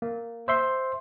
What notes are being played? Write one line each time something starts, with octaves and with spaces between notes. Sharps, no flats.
A#3
C5 E5 C6